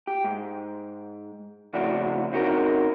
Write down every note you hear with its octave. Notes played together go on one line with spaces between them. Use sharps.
G4
G#2
F2 A2 C#3 F#4 D5
C4 C#4 D#4 F#4 A#4